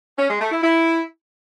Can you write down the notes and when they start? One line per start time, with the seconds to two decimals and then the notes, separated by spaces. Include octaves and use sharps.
0.19 C#4
0.30 G#3
0.41 A3
0.52 E4
0.63 E4